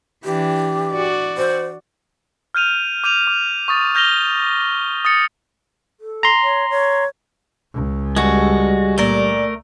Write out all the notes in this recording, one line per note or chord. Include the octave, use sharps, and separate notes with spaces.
E3 D4 G4
F#4 D5
C5
F6 G6 D#7 F7
D6 G6 D#7 F7
D6
C#6 D#6 A6
F6 G6 A#6 F7 G7
D#6 A6 C#7
A4
A#5 C6
C#5
C#5
C#2
G2 G3 G#3 F#4 A4
A#2 A3 A#4 D5